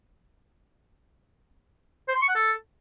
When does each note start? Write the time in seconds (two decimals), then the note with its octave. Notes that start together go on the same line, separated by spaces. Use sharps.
2.08 C5
2.15 C6
2.22 C#6
2.28 F#5
2.35 A4